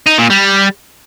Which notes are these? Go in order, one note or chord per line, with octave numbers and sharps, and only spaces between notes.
D#4
A#2
G3